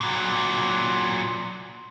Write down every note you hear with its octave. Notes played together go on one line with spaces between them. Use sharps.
A#2 F#3